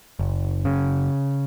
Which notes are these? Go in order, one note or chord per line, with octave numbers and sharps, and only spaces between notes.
F#1
C#3